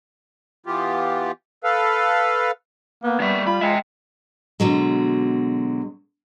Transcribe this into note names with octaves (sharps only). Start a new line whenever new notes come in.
E3 B3 F4 G4
A4 B4 F5
A#3 B3
G3 A#3 E5
F4 B5
G#3 E5 G5
B2 D3 F#3 G#3